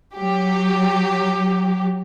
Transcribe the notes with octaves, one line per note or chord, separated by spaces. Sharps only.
F#3 G4